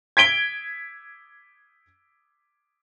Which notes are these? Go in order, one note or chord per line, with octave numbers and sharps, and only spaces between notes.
G#6 B6 D7 G7